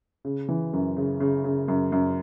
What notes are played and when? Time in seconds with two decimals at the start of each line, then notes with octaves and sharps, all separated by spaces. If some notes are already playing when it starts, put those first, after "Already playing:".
0.25 C#3
0.49 E3
0.73 F#2
0.97 C#3
1.20 C#3
1.44 C#3
1.68 F#2
1.92 F#2